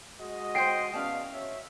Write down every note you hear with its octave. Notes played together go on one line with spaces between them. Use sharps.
G#3 F#4 D#5
C5 C#5 G5 C7 D7
E2 B2 C#4 D5 F5 A5
F#4 C#5 E5